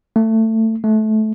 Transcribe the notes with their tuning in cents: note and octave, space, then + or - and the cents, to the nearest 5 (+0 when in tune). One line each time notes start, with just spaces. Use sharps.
A3 +20
A3 -20